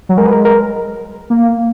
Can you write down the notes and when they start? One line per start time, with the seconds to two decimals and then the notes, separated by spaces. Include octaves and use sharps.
0.09 F#3
0.17 G#3 A#4
0.26 B4
0.31 A#4
0.45 A#4
1.30 A#3